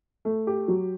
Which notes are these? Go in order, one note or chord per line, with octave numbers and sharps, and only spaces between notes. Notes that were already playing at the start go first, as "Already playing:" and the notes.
A3
G4
F#3